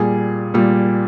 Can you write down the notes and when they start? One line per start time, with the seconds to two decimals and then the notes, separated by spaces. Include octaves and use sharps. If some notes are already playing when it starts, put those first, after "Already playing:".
Already playing: A#2 G3 G#4
0.54 A#2 G3